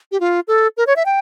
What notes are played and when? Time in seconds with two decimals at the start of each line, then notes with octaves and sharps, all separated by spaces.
0.12 G4
0.20 F4
0.48 A4
0.77 A#4
0.87 C#5
0.96 E5
1.06 G5